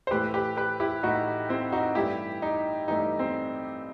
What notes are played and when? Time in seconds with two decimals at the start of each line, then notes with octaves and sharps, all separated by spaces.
0.07 C5
0.11 A2 E3 A3 G4 B4
0.34 G4 B4
0.57 G4 B4
0.80 E4 G4
1.03 A2 E3 A3 D#4 F#4
1.49 C4 E4
1.72 D#4 F#4
1.95 G2 E3 A3 E4 G4
2.42 D#4
2.88 G2 E3 A3 D#4
3.19 C4